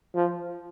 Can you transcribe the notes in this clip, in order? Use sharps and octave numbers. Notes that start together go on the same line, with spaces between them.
F3